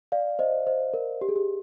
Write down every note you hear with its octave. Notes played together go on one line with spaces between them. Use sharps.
D5 F5
C5 D#5
C5 D#5
A#4
G4
G#4
G4